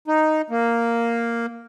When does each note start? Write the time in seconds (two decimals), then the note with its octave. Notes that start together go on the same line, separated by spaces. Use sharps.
0.08 D#4
0.50 A#3